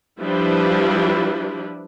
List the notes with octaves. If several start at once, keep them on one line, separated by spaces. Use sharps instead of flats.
F3 G3 D4 E4 B4